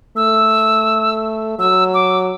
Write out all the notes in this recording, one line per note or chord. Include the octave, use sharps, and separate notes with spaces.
A3 E6
F#3 E6
D6